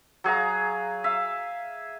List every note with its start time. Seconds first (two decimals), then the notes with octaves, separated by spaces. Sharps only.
0.24 F#3 G#4 F5 A#5
1.04 E5 F5